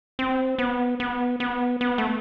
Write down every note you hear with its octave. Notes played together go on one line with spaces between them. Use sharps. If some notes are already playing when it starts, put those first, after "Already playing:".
C4
B3
B3
B3
B3
A3